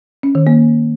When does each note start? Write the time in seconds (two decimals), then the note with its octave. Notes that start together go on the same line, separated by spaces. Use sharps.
0.23 C#4
0.35 D#3
0.47 A#3